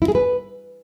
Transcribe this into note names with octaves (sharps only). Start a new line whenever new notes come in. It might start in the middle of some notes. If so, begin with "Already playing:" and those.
E4
G#4
B4